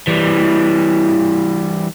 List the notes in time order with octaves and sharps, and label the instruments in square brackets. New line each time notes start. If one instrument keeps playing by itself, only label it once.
[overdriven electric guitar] E3 G3